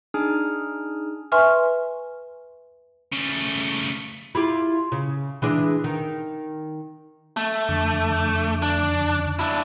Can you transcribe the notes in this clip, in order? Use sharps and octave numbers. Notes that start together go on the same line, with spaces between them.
D4 D#4 G#4 G#5 F6
B4 E5 G#5 C6 C#6 F6
C#3 A3
E4 F4 G4
C#3
E3 G#3 D4
D#3
A3
F2 D3 D6
D4
D4 E4